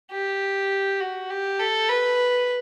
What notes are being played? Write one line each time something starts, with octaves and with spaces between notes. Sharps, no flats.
G4
F#4
G4
A4
B4